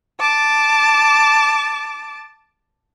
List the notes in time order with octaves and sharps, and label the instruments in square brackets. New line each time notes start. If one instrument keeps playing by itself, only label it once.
[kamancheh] A5 D6